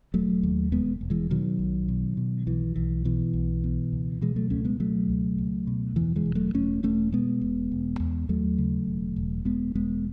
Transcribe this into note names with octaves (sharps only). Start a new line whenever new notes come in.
E1 F#3 A3
D#2
E1 G#3 B3
E1
E3 G#3
B2 D#3 F#3
B1
B2
B2
B1 E3
B1 E3
B2 E3
B1
B2
C#2
B2 E3 G#3
F#3 A3
C#2 A3 C#4
G#3 B3
B2 F#3 A3
C#2
C#2
B2
E2 E3
E3 G#3
E1
F#3 A3
E1 A3 C#4
E1 A3 C#4
B2 G#3 B3
E1
E1
E2
D#2 F#3 A3
C#3
E1
E1
E1 G#3 B3
E1 G#3 B3